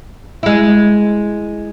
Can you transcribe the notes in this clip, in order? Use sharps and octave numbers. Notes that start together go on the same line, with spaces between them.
G#3 E4